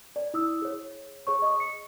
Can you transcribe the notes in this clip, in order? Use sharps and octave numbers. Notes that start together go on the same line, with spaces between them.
D5
E4 D#6 E6
G#4 C#5
G#4 C#5 C#6
D#5 C#6 D#6
C#7